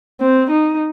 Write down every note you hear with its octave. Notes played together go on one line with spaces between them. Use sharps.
C4
D#4